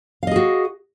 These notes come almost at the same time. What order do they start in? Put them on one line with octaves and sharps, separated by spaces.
F5 D#5 G#4 F#4